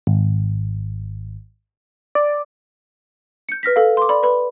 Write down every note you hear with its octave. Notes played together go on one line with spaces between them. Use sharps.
G#1
D5
G6 C#7
B4 F6 A#6 B6
A4 F5
C6 D6
D5 B5
B4 B5